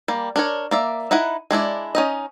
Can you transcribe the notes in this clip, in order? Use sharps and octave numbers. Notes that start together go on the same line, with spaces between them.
G3 A#3
D4 A#4 C#5
A#3 D5 E5
D#4 E4 B4 F#5
G#3 D4 E4 D5
C#4 D#4 D#5